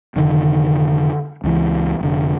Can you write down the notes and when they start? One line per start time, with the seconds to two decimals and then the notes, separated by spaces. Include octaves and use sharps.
0.16 F1 D3 D#3 D4
1.44 C#2 E3
2.01 F1 D3